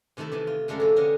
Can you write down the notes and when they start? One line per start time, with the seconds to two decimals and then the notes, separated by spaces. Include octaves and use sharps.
0.17 C3 D#3 A3 E4 A4
0.32 C3 D#3 E3
0.47 F4
0.68 F#2 D3 G#3 A3 A4 A#4
0.80 C3 F3 A#3
0.96 D3 B3 C#4 G4 G#4 A#4